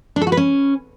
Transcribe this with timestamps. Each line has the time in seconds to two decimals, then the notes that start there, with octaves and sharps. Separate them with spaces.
0.16 D4
0.21 A4
0.27 F#4
0.32 B4
0.37 C#4